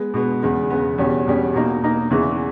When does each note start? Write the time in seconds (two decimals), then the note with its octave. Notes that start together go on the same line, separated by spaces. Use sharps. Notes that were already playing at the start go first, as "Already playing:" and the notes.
Already playing: G#3 B3
0.14 B2 G#3 B3
0.42 E2 C#3 G#3 B3
0.70 E2 C#3 G#3 B3
0.98 E2 B2 G3 C#4
1.26 E2 B2 G3 C#4
1.54 B2 A#3 D#4
1.83 B2 A#3 D#4
2.10 E2 C#3 E3